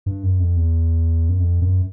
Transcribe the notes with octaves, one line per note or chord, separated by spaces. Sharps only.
G2
F#2
F2
E2
F#2
F2
F#2